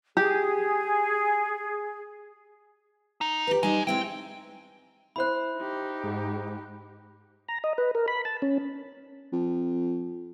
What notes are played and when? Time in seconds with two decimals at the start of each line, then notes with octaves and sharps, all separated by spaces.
0.17 G4 G#4
3.21 D#4
3.47 G4 B4
3.63 G3 G#3 D#4
3.87 G#3 C4 E4 G5
5.16 E4 C5 B5 F#6
5.57 D#4 G4
6.03 G#2
7.48 A#5
7.64 D#5
7.78 B4
7.95 A#4
8.08 B5
8.25 A5
8.42 C#4
9.33 F2